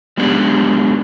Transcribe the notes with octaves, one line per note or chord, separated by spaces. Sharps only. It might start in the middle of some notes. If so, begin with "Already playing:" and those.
F#3 G#3 B3 C#4 D4 G4